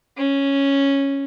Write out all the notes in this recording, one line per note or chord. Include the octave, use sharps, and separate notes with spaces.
C#4